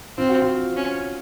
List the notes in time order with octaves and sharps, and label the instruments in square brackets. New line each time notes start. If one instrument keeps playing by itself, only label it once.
[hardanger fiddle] C4 [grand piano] F4
[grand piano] F#4
F4
[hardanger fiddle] C#4